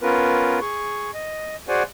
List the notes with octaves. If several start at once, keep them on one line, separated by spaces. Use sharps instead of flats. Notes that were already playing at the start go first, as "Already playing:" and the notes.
B3 C#4 F4 A#4 B4
G#4 C#6
D#5
F#4 G#4 C5 D5 F#5 G#5